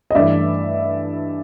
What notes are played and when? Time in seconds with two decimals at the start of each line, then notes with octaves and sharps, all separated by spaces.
0.11 D#5
0.15 G2 E3 A3 D5 E5